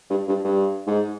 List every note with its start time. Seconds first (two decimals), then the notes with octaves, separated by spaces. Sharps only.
0.10 G2
0.28 G2
0.44 G2
0.87 G#2